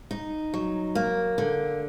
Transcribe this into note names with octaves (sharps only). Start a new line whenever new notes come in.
D#4
F#3
A#3
D3